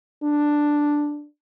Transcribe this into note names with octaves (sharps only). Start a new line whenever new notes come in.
D4